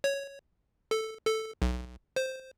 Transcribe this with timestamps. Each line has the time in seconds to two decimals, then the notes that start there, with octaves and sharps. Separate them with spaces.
0.04 C#5
0.91 A4
1.27 A4
1.62 B1
2.16 C5